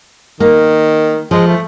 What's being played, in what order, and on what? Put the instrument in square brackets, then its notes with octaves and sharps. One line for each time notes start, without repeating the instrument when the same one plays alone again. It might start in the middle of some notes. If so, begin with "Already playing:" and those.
[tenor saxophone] D#3 [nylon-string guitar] A#3
[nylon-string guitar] F3 [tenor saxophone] G#3
[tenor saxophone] A3